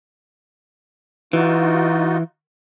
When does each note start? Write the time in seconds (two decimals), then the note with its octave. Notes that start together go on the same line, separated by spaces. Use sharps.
1.33 E3 D#4 F4 F#4